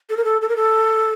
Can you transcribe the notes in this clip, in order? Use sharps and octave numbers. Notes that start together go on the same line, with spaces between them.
A4
A#4
A4
A4
A#4
A4